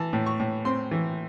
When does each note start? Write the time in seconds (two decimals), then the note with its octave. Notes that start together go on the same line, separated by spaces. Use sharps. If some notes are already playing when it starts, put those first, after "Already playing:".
Already playing: E3 A5
0.13 A2
0.26 C#6
0.40 A2
0.65 C4 C6
0.91 E3